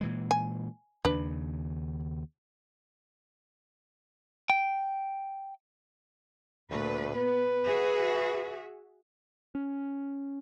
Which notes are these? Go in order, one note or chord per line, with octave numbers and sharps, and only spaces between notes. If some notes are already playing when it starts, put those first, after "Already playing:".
A#2 E3 G#3
G#5
D#2 C#3 D4 B4
G5
D2 A#2 A3 B4
B3 B4
F#4 G#4 E5
C#4